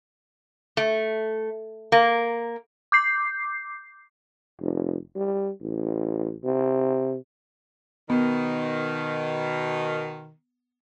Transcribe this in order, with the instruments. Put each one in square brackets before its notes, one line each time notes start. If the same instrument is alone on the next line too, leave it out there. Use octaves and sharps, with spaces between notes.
[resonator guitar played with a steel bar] A3
A#3
[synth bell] D6 G6 C7
[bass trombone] F1
G3
A1
C3
[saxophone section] B2 D#3 [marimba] B3